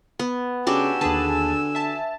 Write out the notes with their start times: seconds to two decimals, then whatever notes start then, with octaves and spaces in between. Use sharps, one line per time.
0.19 B3
0.67 C#3 D4 F#4 G4 G#5 E6
1.01 D#2 D3 G#4 B4 A5
1.75 E5 A5